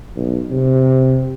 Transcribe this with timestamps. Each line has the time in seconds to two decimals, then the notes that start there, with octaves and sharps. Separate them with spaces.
0.16 B1
0.51 C3